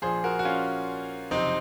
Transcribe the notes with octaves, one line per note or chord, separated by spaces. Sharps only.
A#1 A#2 F3 G#4 C5
F#4 A#4
F#4
C#4 F4
F#1 F2 C3 C4 D#4